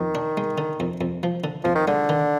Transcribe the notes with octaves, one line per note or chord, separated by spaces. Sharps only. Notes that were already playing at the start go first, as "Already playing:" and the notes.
Already playing: F2 D#3
D4
G#3
D3
F2
F2
F3
D3
F2 F3
D#3
D3 G#3
D#3